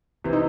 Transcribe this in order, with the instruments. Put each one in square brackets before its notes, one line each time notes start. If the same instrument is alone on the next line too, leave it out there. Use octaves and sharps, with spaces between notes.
[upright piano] C3 E3 [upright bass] D4
[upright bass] D#4